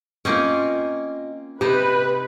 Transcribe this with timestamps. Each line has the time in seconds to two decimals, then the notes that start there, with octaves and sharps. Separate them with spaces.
0.25 A#3 C4 C#4 F4 D#5
1.61 C3 D#4 G4 B4 C5